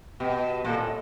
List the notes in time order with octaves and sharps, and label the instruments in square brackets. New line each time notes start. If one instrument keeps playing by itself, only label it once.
[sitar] B2 [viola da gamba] G4
[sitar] A#2 [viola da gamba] A4
[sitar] A2